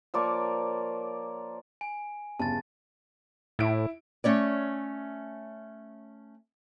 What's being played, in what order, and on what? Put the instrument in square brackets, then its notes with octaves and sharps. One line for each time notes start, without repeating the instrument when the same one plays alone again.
[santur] F3 A#3 C#5 D5
[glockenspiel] G#5
[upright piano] G1 E2 C#3 [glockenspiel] A5 A6
[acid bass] A2 [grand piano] E4 D7
[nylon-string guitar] A3 C#4 C#5 D5